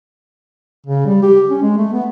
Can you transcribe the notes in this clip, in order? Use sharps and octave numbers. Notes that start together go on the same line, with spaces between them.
C#3
G3
G4
C#4
G#3
A3
B3